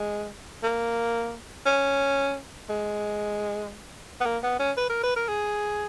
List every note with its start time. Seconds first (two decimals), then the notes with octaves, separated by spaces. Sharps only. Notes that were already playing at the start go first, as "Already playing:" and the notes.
Already playing: G#3
0.63 A#3
1.66 C#4
2.70 G#3
4.21 B3
4.26 A#3
4.43 B3
4.60 C#4
4.77 B4
4.90 A#4
5.03 B4
5.16 A#4
5.29 G#4